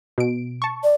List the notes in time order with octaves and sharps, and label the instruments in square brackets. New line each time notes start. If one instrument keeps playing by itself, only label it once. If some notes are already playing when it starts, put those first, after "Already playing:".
[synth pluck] B2 D7
A5 C#6
[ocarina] D5